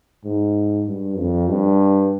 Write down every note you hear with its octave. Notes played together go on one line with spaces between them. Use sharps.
G#2
G2
F2
G2